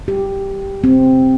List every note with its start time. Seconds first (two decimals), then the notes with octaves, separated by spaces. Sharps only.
0.08 G4
0.84 C4